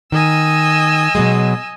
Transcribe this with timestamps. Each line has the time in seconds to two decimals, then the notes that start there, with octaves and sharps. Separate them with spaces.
0.12 D#3 D#5 G#5 E6
1.15 B2 F#3 G#3